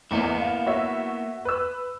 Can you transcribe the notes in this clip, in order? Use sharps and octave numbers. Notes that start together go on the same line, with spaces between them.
A1 E2 A#3 B3 E4
F5
F#4 C#5 E5
B4 E6